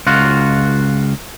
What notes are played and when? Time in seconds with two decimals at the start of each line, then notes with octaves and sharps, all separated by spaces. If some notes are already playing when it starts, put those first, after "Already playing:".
0.07 C#2 F4 F#4